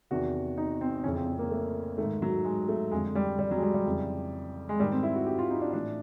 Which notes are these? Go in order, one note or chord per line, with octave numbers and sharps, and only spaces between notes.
E2 C3 D#3 F#4
D#4
C4
F2 C#3 E3 C#4
C4
C4
A#3
A3
G#2 D#3 A3
F#3
G#3
A3
F2 D3 G#3
G3
G3
F#3
G#3
G3
G3
F2 C#3 E3
G#3
G#2 D#3 G3
C4
E4
F#4
G4
F4
D#4
D4
A2 E3 D4